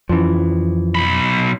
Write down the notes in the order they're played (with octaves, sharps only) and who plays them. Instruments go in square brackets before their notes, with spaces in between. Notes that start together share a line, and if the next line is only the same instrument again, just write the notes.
[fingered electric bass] F2 C#4 [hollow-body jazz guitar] E3 F3
[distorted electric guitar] B1 B5